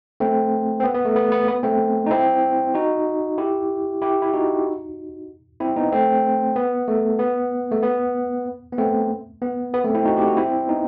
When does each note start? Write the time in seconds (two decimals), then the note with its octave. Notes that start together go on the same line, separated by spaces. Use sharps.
0.20 A3 C4
0.80 C4
0.84 B3
0.94 B3
1.05 A3
1.16 B3
1.32 B3
1.48 B3
1.63 A3 C4
2.06 D#4
2.11 C4 E4
2.74 D#4 F#4
3.38 E4 G4
4.02 E4 G4
4.22 E4
4.33 D#4 F#4
5.60 C4 E4
5.76 B3 D#4
5.92 A3 C4
6.56 B3
6.88 A3
7.19 B3
7.72 A3
7.83 B3
8.72 B3
8.78 A3 C4
9.42 B3
9.74 B3
9.84 A3 C4
9.95 C4 E4
10.05 D#4 F#4
10.17 G4
10.27 F#4
10.37 C4 E4
10.69 B3 D#4